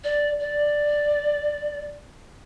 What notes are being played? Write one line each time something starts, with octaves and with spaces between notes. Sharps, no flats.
D5
D5